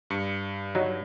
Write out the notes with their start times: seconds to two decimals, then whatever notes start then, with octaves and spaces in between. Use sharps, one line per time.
0.10 G2 C#7
0.75 F#3 D#4